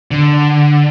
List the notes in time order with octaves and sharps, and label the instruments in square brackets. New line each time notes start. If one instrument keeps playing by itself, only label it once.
[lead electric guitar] D3